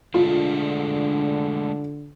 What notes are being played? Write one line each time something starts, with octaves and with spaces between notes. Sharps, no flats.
D3 G#3 A3 D4 F4